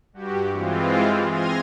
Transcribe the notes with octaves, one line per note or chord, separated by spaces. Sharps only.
G2 F#4 G4
E3 G#3 C4 F4
C6 F6 G#6 A#6 D#7